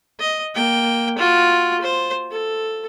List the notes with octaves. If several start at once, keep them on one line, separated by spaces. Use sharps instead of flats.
D#5
A#3 G5
F4 F#4
C5
A4